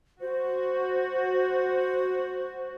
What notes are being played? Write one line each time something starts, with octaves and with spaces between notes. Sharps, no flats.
F#4 C5